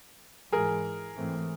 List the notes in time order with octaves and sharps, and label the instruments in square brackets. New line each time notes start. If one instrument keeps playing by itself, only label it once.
[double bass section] G#2 E3 G#3 [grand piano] G#4 A#4
[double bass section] G#2 E3 A3 C4